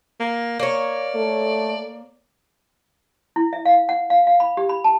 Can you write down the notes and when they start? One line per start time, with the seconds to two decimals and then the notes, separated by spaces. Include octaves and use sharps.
0.20 A#3
0.59 A#3 C#5 D5
1.16 A3
3.36 E4
3.53 E5
3.65 F5
3.89 F#5
4.10 F5
4.27 F5
4.40 B5
4.57 G4
4.69 B5
4.84 A5